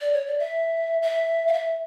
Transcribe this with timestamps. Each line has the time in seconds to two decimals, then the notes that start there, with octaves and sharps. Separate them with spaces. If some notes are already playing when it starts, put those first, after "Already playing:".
0.01 D5
0.13 C#5
0.27 D5
0.39 E5
1.02 E5
1.48 F5
1.53 E5